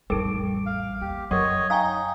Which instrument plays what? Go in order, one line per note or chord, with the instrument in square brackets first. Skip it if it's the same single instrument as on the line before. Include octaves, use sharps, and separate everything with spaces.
[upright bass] A1 F2 [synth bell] G3 D7 [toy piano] D#4 A4 A#4
[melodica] F5
[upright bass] D#2 [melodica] G4
[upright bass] F#2 [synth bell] F#3 [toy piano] A#4 C#6 [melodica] C#5 D#5
[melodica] D#4 [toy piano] F5 G#5 [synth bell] G5 A#5 D#6